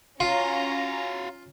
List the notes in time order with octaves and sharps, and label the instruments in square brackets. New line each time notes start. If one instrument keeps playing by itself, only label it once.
[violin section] C#4 A#5 [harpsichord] F4 [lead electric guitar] F#4 F5